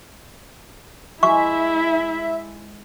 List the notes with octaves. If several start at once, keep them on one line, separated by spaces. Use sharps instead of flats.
G#3 E4 E5 C#6